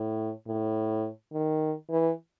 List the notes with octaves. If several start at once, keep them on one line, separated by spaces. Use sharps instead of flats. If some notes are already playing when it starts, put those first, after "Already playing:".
Already playing: A2
A2
D#3
E3